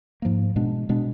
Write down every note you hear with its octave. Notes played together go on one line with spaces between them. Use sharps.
G#2 F3 A#3
B2 G#3 B3 D4
B2 G#3 B3 D4